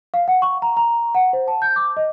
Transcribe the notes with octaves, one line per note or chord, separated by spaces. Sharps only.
F5
F#5
C#6
A#5
A#5
F#5
C5
A5
G6
D6
D#5